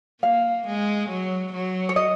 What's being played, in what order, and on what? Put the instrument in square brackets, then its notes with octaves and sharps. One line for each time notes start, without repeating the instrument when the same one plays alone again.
[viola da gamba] A#3 [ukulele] F5
[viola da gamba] G#3
F#3
F#3
[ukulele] C#5
D#5